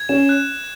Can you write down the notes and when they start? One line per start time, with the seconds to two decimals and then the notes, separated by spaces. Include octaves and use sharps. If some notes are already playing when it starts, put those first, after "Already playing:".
Already playing: G#6
0.09 C#4 E7
0.29 F#6